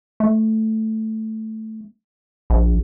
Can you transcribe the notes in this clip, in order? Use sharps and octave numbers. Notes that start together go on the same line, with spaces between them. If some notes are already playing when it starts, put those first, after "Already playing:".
A3
A#1